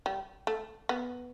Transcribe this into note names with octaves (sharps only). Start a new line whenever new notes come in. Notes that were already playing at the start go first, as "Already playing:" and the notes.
G3
A3
B3